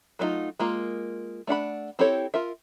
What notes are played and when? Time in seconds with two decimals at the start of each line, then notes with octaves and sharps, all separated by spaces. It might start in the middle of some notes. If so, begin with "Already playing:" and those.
0.19 F#3 A3 D4 D#4 F4
0.59 G#3 A#3 F4
1.47 A3 D4 F#5 B5
1.99 C4 E4 G4 A4 C#5
2.34 F4 A#4 E5